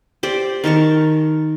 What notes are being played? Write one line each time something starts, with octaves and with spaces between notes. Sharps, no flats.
G4 C5 D5
D#3 A#4 A5 C#6